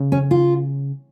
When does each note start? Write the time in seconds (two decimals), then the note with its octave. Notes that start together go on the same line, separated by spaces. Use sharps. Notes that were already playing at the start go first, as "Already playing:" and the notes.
Already playing: C#3
0.12 C#4
0.31 F4